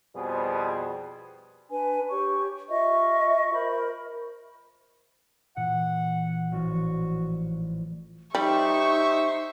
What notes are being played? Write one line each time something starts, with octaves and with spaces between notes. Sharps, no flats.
F2 B2 G3 G#4 B4 C5
D4 B4 G#5
G4 C#5 C#6
F4 D#5 E5 C#6
A#4 C5 B5
A#2 E3 F#5
A1 F3 F#4 D5
G3 D#4 G4 C5 E5 C#6